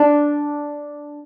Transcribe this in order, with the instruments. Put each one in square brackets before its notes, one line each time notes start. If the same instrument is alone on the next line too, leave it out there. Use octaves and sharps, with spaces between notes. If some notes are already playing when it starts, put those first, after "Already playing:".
Already playing: [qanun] D4